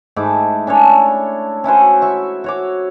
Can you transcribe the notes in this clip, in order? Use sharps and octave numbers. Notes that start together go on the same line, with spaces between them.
G#2 A3 E4 D6
C#4 D4 A4 C#5
C#4 E4 F#4 C5
E5 C#6
F#4 C#5 D6